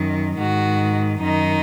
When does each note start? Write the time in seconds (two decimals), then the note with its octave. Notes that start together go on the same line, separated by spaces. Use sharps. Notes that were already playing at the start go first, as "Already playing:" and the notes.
Already playing: F#2 D#3
0.38 G#2 D#3 F#4
1.21 F#2 D#3 D#4